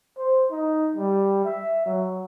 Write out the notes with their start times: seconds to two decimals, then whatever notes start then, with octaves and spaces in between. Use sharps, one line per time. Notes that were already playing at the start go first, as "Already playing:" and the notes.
0.18 C5
0.51 D#4
0.96 G3
1.45 E5
1.86 F#3